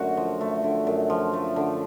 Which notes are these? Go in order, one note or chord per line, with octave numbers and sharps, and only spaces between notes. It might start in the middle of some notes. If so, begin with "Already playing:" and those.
Already playing: F#2 D3 A3 F#4
F3
A3
D3
F#2
F3
A3
D3